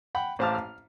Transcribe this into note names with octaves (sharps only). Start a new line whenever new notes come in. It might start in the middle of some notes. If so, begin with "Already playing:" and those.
F#5 G5 B5
A1 C5 F5 A5 D6 F6
F6